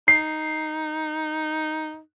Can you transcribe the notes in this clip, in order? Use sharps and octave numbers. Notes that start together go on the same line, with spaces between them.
D#4 C7